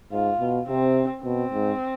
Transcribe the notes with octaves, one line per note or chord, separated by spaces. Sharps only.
G#2 F4
B2
C3 C4
B2 C4
G#2